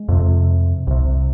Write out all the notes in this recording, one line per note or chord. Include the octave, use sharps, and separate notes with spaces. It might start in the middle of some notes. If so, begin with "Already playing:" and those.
Already playing: G#3
F2 C3
C2 C3